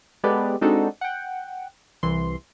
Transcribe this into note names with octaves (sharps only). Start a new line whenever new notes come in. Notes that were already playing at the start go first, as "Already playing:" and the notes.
G#3 B3 G4 A4 B4 D5
G#3 C4 D4 D#4 F#4 A4
F#5 G5
C2 E3 C6